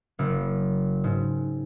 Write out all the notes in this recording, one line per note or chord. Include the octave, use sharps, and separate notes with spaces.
F#1
G#2